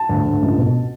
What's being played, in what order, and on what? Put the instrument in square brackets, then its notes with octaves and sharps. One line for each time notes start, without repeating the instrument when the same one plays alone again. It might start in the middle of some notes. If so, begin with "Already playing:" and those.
Already playing: [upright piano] A5
D2
D2
C#2
B2